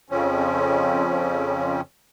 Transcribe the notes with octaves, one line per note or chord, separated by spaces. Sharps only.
F2 C#3 F3 C4 C#4